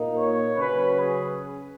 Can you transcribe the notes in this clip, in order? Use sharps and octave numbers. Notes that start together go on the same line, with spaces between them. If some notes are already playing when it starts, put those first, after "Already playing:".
Already playing: A#2 A#3 D#4
C#5
C#3 F#3 C#4 B4
G#4